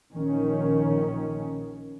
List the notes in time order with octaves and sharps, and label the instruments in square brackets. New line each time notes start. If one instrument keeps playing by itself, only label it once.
[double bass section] A#1 D#3 C#4